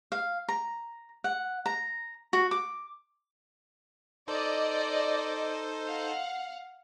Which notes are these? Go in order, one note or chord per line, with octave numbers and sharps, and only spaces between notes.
F5
A#5
F#5
A#5
F#4
D6
D#4 A4 C5 D5 D#5
F5 F#5